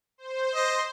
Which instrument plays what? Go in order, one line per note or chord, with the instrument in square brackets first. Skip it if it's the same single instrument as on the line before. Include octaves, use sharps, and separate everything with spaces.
[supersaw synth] C5
[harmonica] D#5